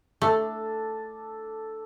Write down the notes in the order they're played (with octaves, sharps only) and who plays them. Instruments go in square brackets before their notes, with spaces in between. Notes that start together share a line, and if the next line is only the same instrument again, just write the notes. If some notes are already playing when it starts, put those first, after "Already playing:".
[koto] A3 [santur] D4 A4